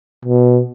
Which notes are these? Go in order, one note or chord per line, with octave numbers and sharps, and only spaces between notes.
B2